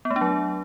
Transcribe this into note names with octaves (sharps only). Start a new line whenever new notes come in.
B3
A3
D4
F#3